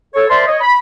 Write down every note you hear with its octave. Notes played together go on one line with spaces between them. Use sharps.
A4 C#5
A#4 C5 D5 E5 A5 C6
C#5 D#5
B5